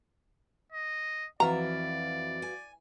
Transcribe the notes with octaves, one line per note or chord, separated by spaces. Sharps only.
D#5
F2 E3 F#4 B4 D5 E5 F5 A#5
G#5